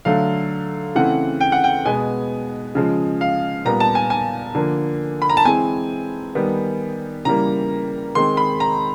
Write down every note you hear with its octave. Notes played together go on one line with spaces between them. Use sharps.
D3 F#3 A3 F5
C#3 E3 A3 C4 F#5
G5
F#5
G5
B2 G#3 B3 G#5
C#3 F3 G#3
F5
A#2 G3 B3 A#5
A5
G#5
G#5
D3 F3 A#3
B5
A#5
A5
E3 G#3 C4 G#5
D#3 G3 B3
C#3 E3 G3 A#3 A#5
D#3 G#3 C4 C6
B5
A#5